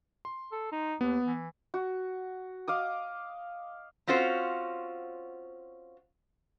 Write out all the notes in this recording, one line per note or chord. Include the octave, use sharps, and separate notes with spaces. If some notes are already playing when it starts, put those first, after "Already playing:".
C6
A4
D#4
D#2 B3
E3
F#4
D#5 F5 D6 D#6
C4 C#4 F4 F#4 C5